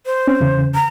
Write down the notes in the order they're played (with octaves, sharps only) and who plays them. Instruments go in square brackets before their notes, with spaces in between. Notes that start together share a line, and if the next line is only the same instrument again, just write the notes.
[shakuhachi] C5
[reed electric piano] C4 C#4
E2 C#3
[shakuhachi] A#5